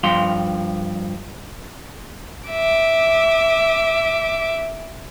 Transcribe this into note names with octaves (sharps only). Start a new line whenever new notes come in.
G2 F3 F5 C6
E5 D6